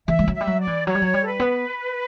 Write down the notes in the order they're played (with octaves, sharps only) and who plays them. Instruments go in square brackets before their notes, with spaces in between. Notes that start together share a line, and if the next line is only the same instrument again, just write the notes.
[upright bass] E3 [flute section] E5
[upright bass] G3
F#3
[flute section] E5
[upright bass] G3
F#3
[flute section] D5
[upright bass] E3
[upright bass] F#3 [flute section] C#5
[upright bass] G3
F#3
G3
[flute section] A4
B4
[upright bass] B3